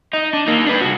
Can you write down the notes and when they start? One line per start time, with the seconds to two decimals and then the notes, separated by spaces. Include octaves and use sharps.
0.13 D#4
0.33 D4
0.47 A#3 D#4
0.66 D4 B4
0.81 C2 F#4